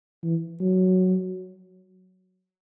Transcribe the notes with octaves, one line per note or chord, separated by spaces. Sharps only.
E3
F#3